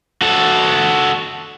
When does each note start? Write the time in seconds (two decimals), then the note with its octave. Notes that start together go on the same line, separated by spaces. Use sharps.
0.22 F#4 A4